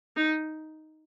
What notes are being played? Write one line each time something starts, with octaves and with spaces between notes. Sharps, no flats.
D#4